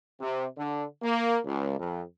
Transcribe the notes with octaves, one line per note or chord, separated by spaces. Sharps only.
C3
D3
A#3
C#2
F2